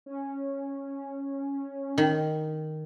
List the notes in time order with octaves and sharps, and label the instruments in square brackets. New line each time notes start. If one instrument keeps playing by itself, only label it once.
[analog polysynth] C#4
[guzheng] D#3